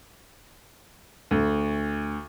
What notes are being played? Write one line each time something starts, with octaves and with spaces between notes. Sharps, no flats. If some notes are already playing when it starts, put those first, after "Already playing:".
D2